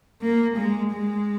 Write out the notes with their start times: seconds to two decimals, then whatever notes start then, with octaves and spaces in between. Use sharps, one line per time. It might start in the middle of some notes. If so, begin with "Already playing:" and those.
0.22 A#3
0.57 G#3
0.93 G#3